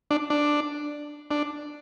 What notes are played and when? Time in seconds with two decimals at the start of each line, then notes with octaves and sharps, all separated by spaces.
0.11 D4
0.30 D4
1.31 D4